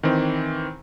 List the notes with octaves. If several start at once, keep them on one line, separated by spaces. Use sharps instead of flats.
D#3 E3 C4